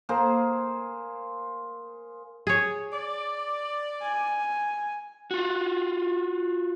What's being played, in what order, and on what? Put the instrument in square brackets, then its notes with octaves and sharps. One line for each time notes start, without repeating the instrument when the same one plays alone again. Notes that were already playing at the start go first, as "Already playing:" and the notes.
[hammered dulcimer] A#3 G#4 C5
[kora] G#4 C#5
[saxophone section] D5
[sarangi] G#5
[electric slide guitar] F4 F#4